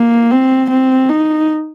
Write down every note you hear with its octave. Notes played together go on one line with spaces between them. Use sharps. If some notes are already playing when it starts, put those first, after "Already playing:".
Already playing: A#3
C4
C4
D#4